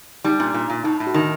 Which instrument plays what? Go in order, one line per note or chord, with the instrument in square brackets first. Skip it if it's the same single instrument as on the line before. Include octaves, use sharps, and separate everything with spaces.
[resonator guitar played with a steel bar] G3 [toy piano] D#4
[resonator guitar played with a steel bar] A#2 [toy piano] D4
[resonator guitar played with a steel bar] A#2
A#2
[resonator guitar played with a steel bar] A2 [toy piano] D#4
[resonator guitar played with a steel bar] A2
[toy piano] F#4
[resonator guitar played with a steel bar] D#3 [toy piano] D#4